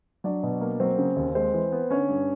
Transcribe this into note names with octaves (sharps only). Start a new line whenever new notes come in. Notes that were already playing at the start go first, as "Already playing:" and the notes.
F#3 D4 D5
B2
A#3
F#3 C4 C5
C#3
D#2
G#3 C4 C5
E3
B3
D3 C#4 C#5
G2